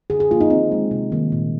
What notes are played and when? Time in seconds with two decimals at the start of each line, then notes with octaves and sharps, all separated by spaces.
0.10 D3 G#4
0.20 G#4
0.31 F3 A#3 F4
0.41 D#4
0.50 D#3 C4
0.72 G#3
0.91 C3
1.12 D#3 G3 A#3
1.32 A#2